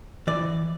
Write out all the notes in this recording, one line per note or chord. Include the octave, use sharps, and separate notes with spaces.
E3 D5